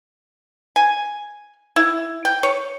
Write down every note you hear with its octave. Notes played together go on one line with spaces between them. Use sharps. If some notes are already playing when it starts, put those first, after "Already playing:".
G#5
E4
G5
C#5